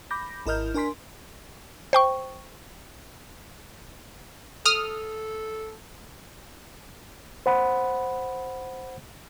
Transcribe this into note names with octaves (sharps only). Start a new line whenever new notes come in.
B5 D6 G6 A#6
G#1 E4 A#4 D#5 F6 G6
D4 A#4 G#5 C6 B6
C5 G5 C#6
A4 D#6 F6
C5 F#5 B5